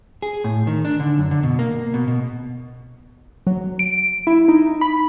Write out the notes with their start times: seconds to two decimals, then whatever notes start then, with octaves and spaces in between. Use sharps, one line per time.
0.22 G#4
0.44 A2
0.67 D#3
0.85 D4
1.00 D3
1.18 F#2
1.31 D3
1.43 B2
1.59 A#3
1.94 B2
2.08 B2
3.47 F#3
3.79 D7
4.27 E4
4.48 D#4
4.81 B5